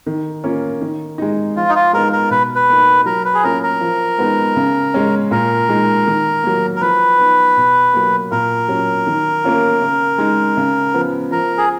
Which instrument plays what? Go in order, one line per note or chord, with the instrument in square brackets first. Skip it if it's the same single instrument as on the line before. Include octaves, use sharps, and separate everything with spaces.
[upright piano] D#3
A#3 C#4 F4
D#3
G#3 D#4
[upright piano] F3 [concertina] F4
[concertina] D#4
F4
[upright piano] G#3 B3 D#4 [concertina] A#4
[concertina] A#4
[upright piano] B2 [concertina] B4
[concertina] B4
[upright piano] A#3 D#4
[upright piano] F#3 [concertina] A#4
[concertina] B4
G#4
[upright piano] A#3 C#4 F4 [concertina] A#4
[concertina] A#4
[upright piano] F3
G#3 B3 D#4
C#3
G#3 C#4
[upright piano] A#2 [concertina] A#4
[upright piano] G#3 D#4
D#3
F#3 A#3
[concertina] A#4
[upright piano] F3 [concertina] B4
[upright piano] B3 D#4
B2
F#3 A#3
[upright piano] A#2 [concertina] A#4
[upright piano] F#3 C#4
D#3
A#3 C#4 F4
C#3
G#3 D#4
C#3
F3 B3
[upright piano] F3 [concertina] A#4
[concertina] G#4